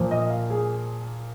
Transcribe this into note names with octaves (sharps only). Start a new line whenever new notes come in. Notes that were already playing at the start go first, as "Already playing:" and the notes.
Already playing: A#2 F3 A#3
D#5
F5
G#4